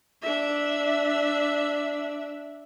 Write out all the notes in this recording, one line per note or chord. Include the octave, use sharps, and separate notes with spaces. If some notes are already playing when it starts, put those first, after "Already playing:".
D4 E5